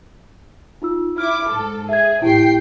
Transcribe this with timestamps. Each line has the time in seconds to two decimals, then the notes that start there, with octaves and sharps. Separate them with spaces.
0.82 D#4 F4 E6
1.18 E4 D6 F6
1.48 G#2 A4
1.89 G#4 E5 G#6
2.22 A1 E4 G4 G5 C7